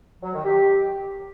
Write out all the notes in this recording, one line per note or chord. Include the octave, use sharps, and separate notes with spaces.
F#3
D#3
G4